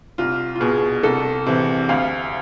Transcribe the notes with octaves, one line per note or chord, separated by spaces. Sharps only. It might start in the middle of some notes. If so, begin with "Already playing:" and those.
C2 F4
F4
B2 G#4
C2 A4
C3 E3
D2 F5